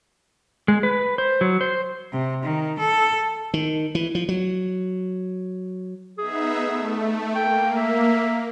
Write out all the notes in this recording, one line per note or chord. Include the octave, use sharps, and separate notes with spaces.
G#3
B4
C5
F#3
C5
C3
D#3
A4
D#3
E3
F3
F#3
B3 D#4 G#4 E5
A3
A#3 G5
E5